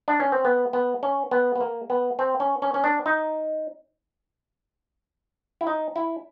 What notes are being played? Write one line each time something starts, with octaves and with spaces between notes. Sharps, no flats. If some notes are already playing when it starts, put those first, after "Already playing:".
D4
C#4
C4
B3
B3
C#4
B3
B3
A#3
B3
C4
C#4
C#4
C#4
D4
D#4
E4
D#4
E4